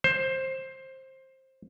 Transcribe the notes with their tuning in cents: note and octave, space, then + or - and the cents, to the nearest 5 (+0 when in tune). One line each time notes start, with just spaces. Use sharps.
C5 +15